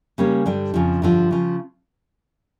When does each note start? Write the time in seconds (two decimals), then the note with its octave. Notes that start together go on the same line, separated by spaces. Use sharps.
0.18 C#3 G3 A#3 C#4
0.46 G2 D3 G3 D4
0.74 F2 C#3 F3
1.02 G2 D3 F3
1.31 C#3 F3